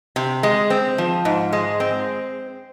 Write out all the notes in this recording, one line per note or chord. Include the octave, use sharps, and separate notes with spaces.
C3
G#3
C4
F3
G#2
G#3
C4